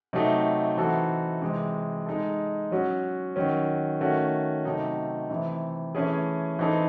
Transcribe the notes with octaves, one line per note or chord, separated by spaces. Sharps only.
C3 F#3 A3 D#4
E3 C4 D#4 F#4 A4
C3 E3 G#3
G#3 D#4 A4
F#3 C#4 F#4
D#3 F#3 C#4
D#3 A3 C#4 F#4 A4
C3 F#3 A3 C4 D#4
C3 E3 A3 C4
E3 A3 C#4 G#4
E3 C4 D#4 A4